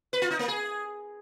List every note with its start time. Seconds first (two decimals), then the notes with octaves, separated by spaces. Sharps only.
0.13 B4
0.22 F4
0.30 D#4
0.39 A#3
0.48 G#4